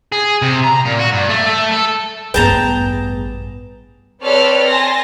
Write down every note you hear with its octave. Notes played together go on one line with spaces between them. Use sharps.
G#4
C3
A#5
A#2
F#4
G2
A3
A3
A4
A1 E2 G2 G#4 B4 G5 A5 A#5
C4 A4 B4 C#5 D5 F6
G#5 A5 C6 A#6